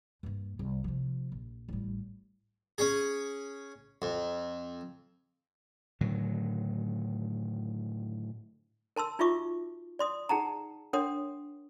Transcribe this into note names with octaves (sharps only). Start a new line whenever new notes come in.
G2 A#3
C2
C3 F3
A#1
A1 G3
C#4 G#4
F2
A2 D3 D#3 F#3
A#4 A5 C6 E6
D#4 F4 F#4 E5 C#6 D6
D5 C6 D#6
D#4 G#4 F#5 A5 A#5
D4 A#4 C#5 F#5 C6 D#6